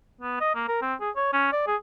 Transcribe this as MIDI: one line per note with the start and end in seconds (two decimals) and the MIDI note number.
0.21 0.40 59
0.40 0.52 75
0.55 0.68 58
0.68 0.80 70
0.82 0.94 60
1.01 1.10 68
1.16 1.29 73
1.33 1.51 61
1.53 1.63 74
1.67 1.76 68